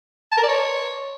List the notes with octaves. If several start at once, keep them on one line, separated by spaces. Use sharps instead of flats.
A5
A#4
D5
C#5